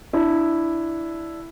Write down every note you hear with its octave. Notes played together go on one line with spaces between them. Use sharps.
D4 E4